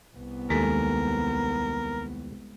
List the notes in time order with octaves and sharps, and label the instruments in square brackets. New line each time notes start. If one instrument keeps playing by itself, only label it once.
[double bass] C2 B3
[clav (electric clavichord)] D#2 [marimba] G#3 A4 [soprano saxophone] A#4